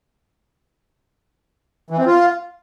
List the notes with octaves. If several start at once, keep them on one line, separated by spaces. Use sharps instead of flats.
E3
C4
F4